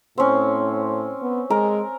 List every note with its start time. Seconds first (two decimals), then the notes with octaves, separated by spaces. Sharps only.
0.18 A2 C4 C#4
1.22 B3
1.50 G#3 A#4